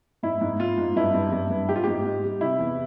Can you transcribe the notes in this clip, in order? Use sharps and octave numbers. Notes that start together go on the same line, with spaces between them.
G#2 E4
G#2
G#2 F4
G#2
G2 E4
G2
G2
G2
G#2 G4
F4
G#2 G4
G#2
G3
C3 E4
E2